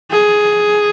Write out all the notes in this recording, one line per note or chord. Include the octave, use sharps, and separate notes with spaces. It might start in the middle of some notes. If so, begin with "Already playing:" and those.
G#4